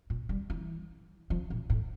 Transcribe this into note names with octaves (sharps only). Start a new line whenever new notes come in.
A#2
G3
E3
F3
A#2
A2